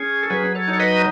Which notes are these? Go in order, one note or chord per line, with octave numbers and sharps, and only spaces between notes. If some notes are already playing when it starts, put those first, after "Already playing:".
Already playing: C#4 G#4
A4
F#3 G#4 B4
A4 C#5
D#4
C#5
B4 D#5